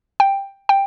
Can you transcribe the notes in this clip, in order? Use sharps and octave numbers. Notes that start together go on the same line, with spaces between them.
G5
G5